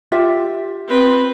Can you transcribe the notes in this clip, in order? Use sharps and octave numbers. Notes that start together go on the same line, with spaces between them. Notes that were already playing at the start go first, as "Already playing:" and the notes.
F4 G4 E5
C4 B4